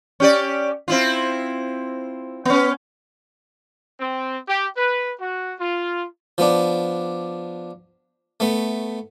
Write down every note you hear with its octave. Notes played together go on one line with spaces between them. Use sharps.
C#4 G4 D5
C4 E4 F4
B3 C#4
C4
G4
B4
F#4
F4
F3 B3 D4
A3 B3